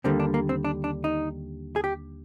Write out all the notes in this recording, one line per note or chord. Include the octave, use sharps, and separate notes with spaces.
D#2 D3 G3 A#3 C4
D4
A#3
C4
D4
D4
D#4
G#4
G4